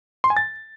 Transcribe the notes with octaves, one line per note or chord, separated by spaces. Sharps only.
C6
G#5
A6